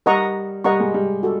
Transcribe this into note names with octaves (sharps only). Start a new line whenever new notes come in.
G3 A#4 D#5 F#5 A#5 C#6
G3 A#4 D#5 F#5 A#5 C#6
G#3
G3
F#4 A4